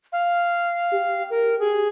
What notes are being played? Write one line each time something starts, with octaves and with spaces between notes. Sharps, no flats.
F5
G4
A#4
G#4